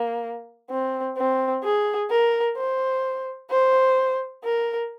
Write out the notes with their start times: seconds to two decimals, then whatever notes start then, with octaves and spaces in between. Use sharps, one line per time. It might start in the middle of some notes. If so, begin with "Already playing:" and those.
Already playing: A#3
0.70 C4
1.17 C4
1.64 G#4
2.10 A#4
2.57 C5
3.50 C5
4.44 A#4